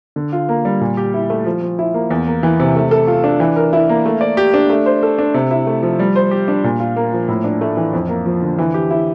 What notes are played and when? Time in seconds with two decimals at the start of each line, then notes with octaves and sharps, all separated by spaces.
0.16 D3
0.32 F4
0.49 A#3
0.65 G3
0.81 A#2
0.97 G4
1.14 E4
1.30 A3
1.45 F3
1.62 F3
1.79 E4
1.94 A#3
2.10 E2
2.27 A#3
2.43 E3
2.60 C3
2.76 A3
2.91 A4
3.07 F4
3.24 D4
3.40 E3
3.56 A#4
3.73 E4
3.89 A#3
4.06 A3
4.21 D5
4.37 G4
4.54 D4
4.70 A3
4.86 C5
5.03 A4
5.19 D4
5.34 C3
5.51 E4
5.67 A3
5.83 F3
5.99 G3
6.16 C5
6.31 G4
6.48 D4
6.64 A#2
6.80 F4
6.96 A#3
7.13 F3
7.28 A2
7.44 D4
7.61 A3
7.77 E3
7.93 F2
8.09 A#3
8.26 F3
8.42 D3
8.59 E3
8.74 G4
8.91 E4